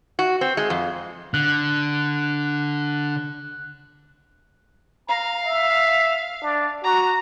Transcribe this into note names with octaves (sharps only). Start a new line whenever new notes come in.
F#4
C4
G#3
F2
D3 F#6
F5 A#5
E5
D4
F#4 A#5